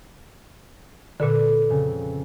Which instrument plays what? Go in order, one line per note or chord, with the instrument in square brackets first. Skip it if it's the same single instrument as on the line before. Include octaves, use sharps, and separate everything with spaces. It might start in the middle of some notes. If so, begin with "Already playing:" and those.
[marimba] A#2 D3 [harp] A4 B4 D5
[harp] F2 C#3